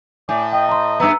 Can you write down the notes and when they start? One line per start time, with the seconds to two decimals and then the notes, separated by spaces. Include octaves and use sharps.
0.29 A2 D5 G#5
0.52 D#5 G5
0.69 A#5 C6
1.00 G2 B3 A#5 E6